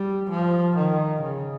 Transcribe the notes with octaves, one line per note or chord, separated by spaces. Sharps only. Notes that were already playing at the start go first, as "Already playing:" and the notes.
Already playing: G3
F3
D#3
C#3